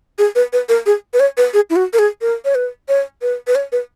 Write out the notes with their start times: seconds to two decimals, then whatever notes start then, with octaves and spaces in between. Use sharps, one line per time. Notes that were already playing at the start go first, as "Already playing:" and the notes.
0.18 G#4
0.35 B4
0.53 B4
0.69 A#4
0.86 G#4
1.14 B4
1.20 C#5
1.37 B4
1.54 G#4
1.70 E4
1.76 F#4
1.93 A#4
1.99 G#4
2.21 A#4
2.45 C#5
2.55 B4
2.88 C#5
3.22 B4
3.47 B4
3.55 C#5
3.72 B4